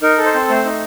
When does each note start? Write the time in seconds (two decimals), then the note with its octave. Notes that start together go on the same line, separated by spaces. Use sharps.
0.02 D#4 A#4
0.18 A4
0.25 C5
0.34 C4
0.49 A3 C5
0.66 D#4